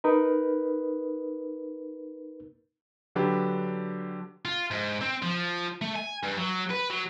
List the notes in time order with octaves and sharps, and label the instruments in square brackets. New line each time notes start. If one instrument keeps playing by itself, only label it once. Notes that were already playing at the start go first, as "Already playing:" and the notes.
[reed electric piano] D#4 A#4 B4
[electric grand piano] D3 F#3 D4 G4 B4
[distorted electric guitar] F4
G#2
C4
F3
A3
G#5
G2
F#3
B4
F#3